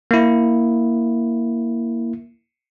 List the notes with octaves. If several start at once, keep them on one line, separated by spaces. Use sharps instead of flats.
A#3 E4